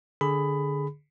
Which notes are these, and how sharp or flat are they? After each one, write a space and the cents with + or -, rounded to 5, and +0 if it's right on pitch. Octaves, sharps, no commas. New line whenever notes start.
D3 +0 G#4 +0 B5 +15